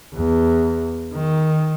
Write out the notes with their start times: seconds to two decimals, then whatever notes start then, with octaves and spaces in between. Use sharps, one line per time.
0.14 E2
1.14 D#3